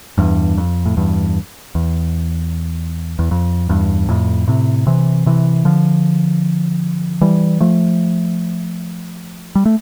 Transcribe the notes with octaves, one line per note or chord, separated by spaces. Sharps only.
E2 G2
F2
A2
E2 G2
E2
E2
F2
E2 G2
F2 A2
A2 C3
C3 E3
C3 E3
D3 F3
E3 G3
F3 A3
G3
A3